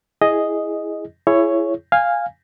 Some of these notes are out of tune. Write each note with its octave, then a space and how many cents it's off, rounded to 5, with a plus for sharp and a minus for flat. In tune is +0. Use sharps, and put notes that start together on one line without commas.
E4 +0 G#4 +0 D#5 +0
E4 +25 G#4 +15 C#5 +0
F5 +0 G#5 -15